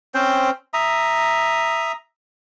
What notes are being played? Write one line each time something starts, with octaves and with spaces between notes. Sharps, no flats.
C4 C#4 C5 G5
E5 A#5 D#6